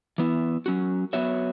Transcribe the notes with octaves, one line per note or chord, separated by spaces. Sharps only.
E3 B3 E4
F#3 C#4 F#4
F#3 B3 F#4 C#5 E5